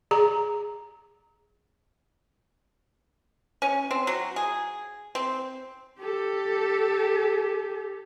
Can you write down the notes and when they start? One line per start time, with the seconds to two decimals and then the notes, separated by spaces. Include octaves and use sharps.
0.11 G#4 A#5
3.62 C#4
3.91 C4
4.07 F#3
4.36 G#4
5.15 C4
5.99 G4 A4